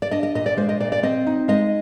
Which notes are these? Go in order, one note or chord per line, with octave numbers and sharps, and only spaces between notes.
D5
D4 D#5
D#5
A#2 D#5
D5
G#3 C5
D#5
A#2 D5
D5
C4 D#5
D#4
G#3 D#5